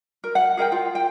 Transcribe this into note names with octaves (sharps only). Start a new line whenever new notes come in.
A#4
F#5
G#4 A#4 F5 G5
F4
G5